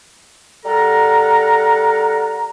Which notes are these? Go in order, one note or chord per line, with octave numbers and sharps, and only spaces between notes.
G3 A4 A#4 F#5 A#5